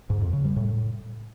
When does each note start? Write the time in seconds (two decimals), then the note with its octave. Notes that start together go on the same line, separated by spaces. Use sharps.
0.10 G#2
0.21 F2
0.33 C#3
0.45 G3
0.56 A2